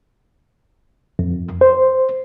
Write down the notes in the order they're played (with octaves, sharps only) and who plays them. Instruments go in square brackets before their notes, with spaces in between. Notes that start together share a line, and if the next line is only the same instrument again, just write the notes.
[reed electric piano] F2
C5